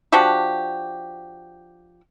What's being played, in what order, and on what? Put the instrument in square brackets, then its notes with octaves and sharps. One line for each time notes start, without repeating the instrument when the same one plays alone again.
[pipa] F3 D4 F#4 G4